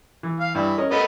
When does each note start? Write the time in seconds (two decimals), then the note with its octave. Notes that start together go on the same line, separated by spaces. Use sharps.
0.23 E3
0.40 F5
0.55 G2 E3
0.78 C#4 A#4 D#5
0.91 A3 B3 A#4 D#5 B5